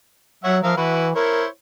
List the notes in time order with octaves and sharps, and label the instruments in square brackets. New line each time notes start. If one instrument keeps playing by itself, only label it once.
[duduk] F#3 [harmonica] C#5 E5 F#5
[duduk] F3 [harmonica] A#4 E5 F5
[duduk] E3 [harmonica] E4 F#4 B4
[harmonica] E4 C5 C#5 [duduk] A#4